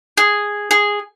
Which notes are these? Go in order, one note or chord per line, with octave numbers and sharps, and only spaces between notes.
G#4
G#4